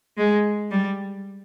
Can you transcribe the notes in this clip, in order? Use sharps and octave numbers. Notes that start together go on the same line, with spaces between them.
G#3
G3